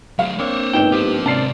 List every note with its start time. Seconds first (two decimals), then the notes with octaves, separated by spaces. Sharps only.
0.19 F#3 A3 F5
0.39 A#3 C4 D4 C5 C#5
0.73 G1 G#2 G5 E7
0.92 F4 G4 C5
1.26 G#2 C3 C#4 F4 D5 A5 C7